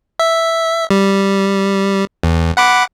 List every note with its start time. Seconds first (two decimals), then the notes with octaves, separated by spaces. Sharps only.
0.19 E5
0.90 G3
2.23 E2
2.57 F#5 B5 D6